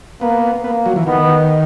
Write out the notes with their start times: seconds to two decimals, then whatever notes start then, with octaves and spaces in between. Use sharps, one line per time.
0.21 A#3 B3
0.64 A#3 B3
0.86 F#3
0.96 E3
1.07 D#3 B3